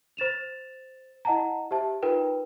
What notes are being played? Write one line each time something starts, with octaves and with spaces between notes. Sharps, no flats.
C5 A6 E7 F7
E4 D#5 F#5 A5 A#5
G4 C5 E5 A5
D#4 F4 A#4 B4 G5